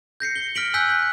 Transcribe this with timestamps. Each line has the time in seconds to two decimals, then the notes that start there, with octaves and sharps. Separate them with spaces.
0.20 G6 A#6 C7 C#7
0.36 G7
0.55 F6 A#6 B6 D7 F#7
0.74 G#5 E6 F#6 G6 B6
0.90 G6